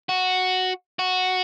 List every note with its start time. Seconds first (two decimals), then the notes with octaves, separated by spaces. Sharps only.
0.09 F#4
0.99 F#4